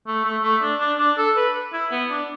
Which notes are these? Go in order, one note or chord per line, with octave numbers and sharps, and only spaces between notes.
A3
A3
A3
D4
D4
D4
A4
B4
E4
B3
D4